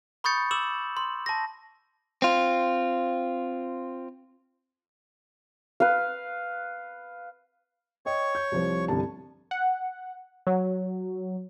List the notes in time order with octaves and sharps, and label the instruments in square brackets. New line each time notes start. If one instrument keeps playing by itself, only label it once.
[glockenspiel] B5 C#6 D#6 G6 A6 C#7
D6 E6 E7 F#7
C6
A5 A#6
[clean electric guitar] C4 F4
[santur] B4 F5
[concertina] C#5 C#6 [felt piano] D#5 G5
[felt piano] G6
C2 F3 C5
G1 C2 A5
[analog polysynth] F#5
F#3